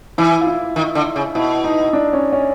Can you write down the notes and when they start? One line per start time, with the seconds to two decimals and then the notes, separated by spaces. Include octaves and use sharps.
0.18 E3 E4
0.41 F4
0.47 E4
0.76 D#3
0.95 D3
1.16 C#3
1.35 B2 E4
1.64 D#4
1.93 D4
2.13 C#4
2.32 C#4